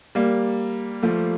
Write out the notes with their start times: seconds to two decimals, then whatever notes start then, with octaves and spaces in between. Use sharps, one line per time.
0.15 G3 A#3
1.02 F3 A3